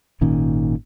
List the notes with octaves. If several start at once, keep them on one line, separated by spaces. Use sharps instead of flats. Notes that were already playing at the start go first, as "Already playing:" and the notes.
G#1 A#2 D#3 C#4